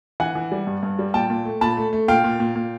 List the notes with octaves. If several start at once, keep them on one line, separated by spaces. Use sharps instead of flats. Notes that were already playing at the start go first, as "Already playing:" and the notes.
E3 F#5 G#5
E3
G3
G2
G2
G3
A#2 G5 A5
A#2
A3
A#2 A5 B5
A3
A3
A#2 F5 G5
A#2
A#2
A#2